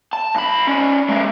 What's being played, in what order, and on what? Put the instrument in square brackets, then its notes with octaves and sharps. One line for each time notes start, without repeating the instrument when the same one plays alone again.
[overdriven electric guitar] A5
B1 B5
C#4 D5
G#3 A#3